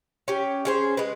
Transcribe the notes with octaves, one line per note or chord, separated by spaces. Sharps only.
C#4 G4
C#4 G#4 C5
G#3 B4